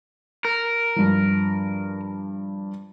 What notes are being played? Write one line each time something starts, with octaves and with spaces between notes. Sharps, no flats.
A#4
G2 F3